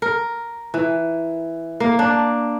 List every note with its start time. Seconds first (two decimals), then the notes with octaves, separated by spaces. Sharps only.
0.02 A#4
0.74 E3
1.80 A#3
1.99 D4